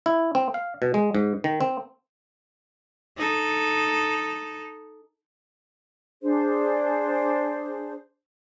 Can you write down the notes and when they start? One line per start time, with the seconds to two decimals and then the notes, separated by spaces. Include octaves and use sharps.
0.06 E4
0.35 C4
0.54 F5
0.82 B2
0.94 G#3
1.15 G#2
1.44 D#3
1.61 C4
3.18 D#4 A4
6.23 D4 G#4 C5